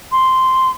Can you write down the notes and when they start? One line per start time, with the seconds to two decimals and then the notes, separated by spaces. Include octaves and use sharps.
0.12 C6